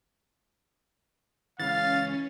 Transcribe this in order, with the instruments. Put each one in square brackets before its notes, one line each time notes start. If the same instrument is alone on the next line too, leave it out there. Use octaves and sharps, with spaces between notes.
[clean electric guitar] C#2 C#3 E3 [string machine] C#4 [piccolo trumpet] F5 [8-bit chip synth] A6